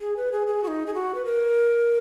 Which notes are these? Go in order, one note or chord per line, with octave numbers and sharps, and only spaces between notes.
G#4
B4
G#4
G#4
F#4
D#4
G#4
F#4
B4
A#4